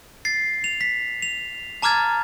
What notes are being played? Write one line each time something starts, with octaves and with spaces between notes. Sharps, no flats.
A6 C7
F7
B6
F7
A5 A#5 D6 F6 G#6 A6